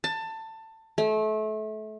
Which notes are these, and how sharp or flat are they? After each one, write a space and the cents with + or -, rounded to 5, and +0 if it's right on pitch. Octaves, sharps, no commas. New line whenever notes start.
A5 +20
A3 -30